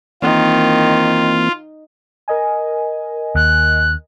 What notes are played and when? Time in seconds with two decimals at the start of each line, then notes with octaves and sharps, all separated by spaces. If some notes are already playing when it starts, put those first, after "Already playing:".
0.22 D#3 E3 A#3 C4 F4
2.28 A#4 D#5 G#5
3.35 D#2 F#6